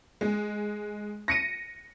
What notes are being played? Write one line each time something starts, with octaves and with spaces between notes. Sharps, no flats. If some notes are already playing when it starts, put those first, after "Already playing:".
G#3
A#6 C#7 D#7